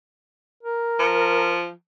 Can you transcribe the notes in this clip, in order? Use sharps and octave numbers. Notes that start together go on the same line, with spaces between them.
A#4
F3